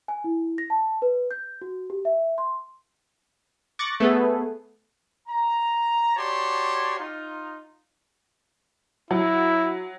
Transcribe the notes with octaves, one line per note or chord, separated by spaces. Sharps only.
G#5
E4
A#6
A5
B4
G6
F#4
G4
E5
C6
C#6 D6 F#6 A6 A#6 C#7
A3 B3 G#4 A4 B4
A#5
F#4 G4 C#5 D5 A5 C6
D#4 F4
F#3 E4